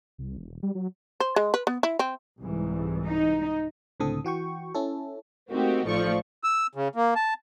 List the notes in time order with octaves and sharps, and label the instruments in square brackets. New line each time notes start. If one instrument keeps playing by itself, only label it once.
[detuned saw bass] C2
E1
G3
F#3
[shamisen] C5
G#3
B4
B3
E4
C4
[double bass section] C2 G#2 E3
[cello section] D#4
[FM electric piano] C#2 A2 D3 C4 A4 D#6
E3 F#4 G5 C#6
C#4 E4 A4
[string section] A3 A#3 C4 D#4 F#4 G4
A1 F3 A3 D5 C#6
[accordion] E6
C#3
A#3
A5